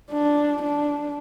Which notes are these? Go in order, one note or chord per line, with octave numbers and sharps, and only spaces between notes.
D4
D4